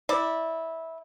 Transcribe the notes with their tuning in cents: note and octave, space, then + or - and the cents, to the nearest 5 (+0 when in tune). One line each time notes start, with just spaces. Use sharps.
E4 -15 D5 +10